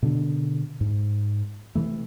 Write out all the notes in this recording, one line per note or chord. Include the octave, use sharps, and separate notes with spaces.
B2 D3 D#3 D4
G#2
C3 E3 A3